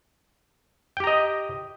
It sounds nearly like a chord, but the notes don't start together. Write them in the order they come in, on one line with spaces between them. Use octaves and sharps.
G5 G4 A#5 D#5